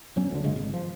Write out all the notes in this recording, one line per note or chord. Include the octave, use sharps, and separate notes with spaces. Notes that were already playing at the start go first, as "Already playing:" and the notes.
E2 F#3 C#4
D2 D3
F#1 C#3 G#3
G#1
F3